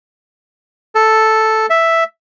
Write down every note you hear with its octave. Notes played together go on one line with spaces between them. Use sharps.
A4
E5